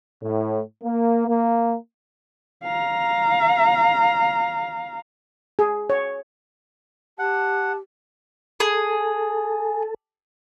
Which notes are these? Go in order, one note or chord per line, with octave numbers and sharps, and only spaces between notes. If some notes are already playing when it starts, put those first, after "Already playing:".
A2
A#3
A#3
F5 A#5
G#4
C#5
G4 F#5 A5
G#4 A4